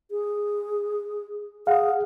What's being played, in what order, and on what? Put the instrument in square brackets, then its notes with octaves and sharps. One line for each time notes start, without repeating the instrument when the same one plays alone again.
[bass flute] G#4
[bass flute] G#4 [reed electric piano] F5 F#5